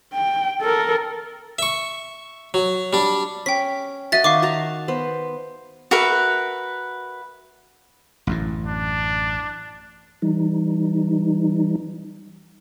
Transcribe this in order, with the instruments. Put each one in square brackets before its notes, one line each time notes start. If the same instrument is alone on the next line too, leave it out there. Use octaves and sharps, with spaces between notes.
[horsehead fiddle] G5
A4 A#4
[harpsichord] E5 C#6
F#3
G3 D4
[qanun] C#4 [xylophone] G5 B6
[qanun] F#4 D#5 [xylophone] E5 A6
[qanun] D#3 [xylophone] F5 C#6 D6
[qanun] F#4 A5 A#5
B3 C5
[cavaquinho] F#4 A#4 B4 E5
[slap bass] A1 F#2 A2
[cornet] D4
[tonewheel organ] E3 G3 D#4